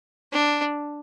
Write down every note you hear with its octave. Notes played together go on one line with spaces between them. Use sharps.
D4